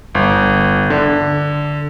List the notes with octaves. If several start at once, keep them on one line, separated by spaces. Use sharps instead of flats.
G1
D3